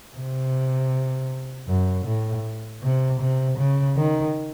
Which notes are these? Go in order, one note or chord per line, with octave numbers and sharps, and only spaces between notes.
C3
F#2
A2
C3
C3
C#3
D#3